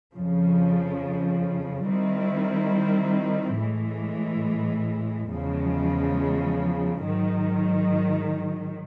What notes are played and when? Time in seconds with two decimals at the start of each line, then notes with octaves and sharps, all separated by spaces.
0.13 F2 C#3 F3
1.87 D#3 G3 C4 E4
3.59 A2 E3 G#3
5.30 E2 C#3 F3 G#3
7.03 G#2 D#3 F#3